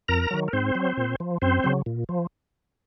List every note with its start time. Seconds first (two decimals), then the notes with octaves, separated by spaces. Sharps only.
0.08 F2 A#4 A#5
0.31 D#3 F#3
0.48 A#4
0.53 G#2 C4 C5
0.75 F#3
0.97 A#2
1.20 F3
1.42 F#2 C4 C5
1.64 C#3 F#3
1.86 A#2
2.09 F3